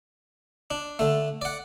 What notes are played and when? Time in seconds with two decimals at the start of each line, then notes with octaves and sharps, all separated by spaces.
0.71 D4
0.99 D3 A3
1.42 D5 F#5